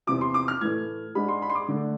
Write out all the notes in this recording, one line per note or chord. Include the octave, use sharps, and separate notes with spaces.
E2 C3 F3 D6
C6
D6
F6
A2 E3 A3 G#6
G#2 G#3 D4 B5
C6
B5
C6
D6
D3 A3 D4